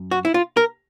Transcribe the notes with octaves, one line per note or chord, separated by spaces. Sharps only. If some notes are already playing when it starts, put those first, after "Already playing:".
Already playing: F#2
F#4
E4
F4
A#4